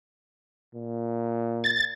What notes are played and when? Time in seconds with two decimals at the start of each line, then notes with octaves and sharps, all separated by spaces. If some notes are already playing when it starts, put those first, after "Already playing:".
0.74 A#2
1.64 A6